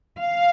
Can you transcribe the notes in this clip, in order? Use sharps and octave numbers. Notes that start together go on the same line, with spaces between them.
F5